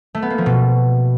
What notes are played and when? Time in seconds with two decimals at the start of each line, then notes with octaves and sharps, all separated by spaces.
0.15 A3
0.22 B3
0.30 A#3
0.38 F3
0.46 B2